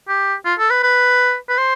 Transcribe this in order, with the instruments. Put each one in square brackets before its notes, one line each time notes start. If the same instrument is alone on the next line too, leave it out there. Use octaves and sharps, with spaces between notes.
[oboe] G4
F4
A4
B4
B4
B4
C5